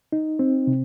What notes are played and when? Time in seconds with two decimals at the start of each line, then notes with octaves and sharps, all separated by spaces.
0.12 D#4
0.39 C4
0.67 C3